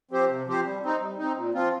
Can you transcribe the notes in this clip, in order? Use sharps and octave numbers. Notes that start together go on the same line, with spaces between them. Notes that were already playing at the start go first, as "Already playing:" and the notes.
F3 C4 G4 C5
C3
F3 C4 G4 C5
G3
C4 D#4
G3
C4 D#4
A#2
F3 C4 F4